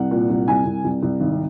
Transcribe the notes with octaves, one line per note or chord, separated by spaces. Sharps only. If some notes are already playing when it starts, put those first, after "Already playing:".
Already playing: C2 F#5
A#2
C2
C2 G#5
C2
C2
C2
G#1